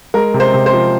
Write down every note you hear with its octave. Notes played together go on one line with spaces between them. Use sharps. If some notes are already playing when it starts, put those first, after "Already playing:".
G#3 A#4
C3
C5
C3
C5
F3